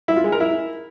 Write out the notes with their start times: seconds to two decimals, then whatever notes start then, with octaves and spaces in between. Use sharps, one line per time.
0.08 E4
0.16 F4
0.24 G#3
0.32 A#4
0.40 E4